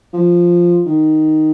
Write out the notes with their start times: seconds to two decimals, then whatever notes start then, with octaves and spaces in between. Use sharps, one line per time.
0.13 F3
0.86 D#3